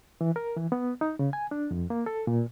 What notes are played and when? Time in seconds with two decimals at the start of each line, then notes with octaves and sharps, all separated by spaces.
0.21 E3
0.36 A#4
0.57 E3
0.72 B3
1.01 D#4
1.19 C#3
1.33 G#5
1.51 D4
1.71 F2
1.90 A#3
2.06 A4
2.27 A#2